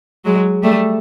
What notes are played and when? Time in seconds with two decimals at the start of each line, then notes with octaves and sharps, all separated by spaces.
0.25 F#3 G#3
0.63 G3 A3